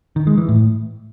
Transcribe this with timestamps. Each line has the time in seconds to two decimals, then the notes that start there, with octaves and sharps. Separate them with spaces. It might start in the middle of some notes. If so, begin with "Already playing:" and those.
0.16 D#3
0.27 G#3
0.38 E3
0.48 A2